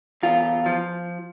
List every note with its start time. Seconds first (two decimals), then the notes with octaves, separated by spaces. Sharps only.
0.23 E2 F4
0.66 F3